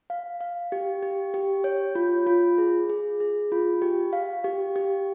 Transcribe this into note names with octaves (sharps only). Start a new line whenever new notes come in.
F5
F5
G4
G4
G4
C#5
F4
F4
G#4
G#4
G#4
F4
G4
F5
G4
G4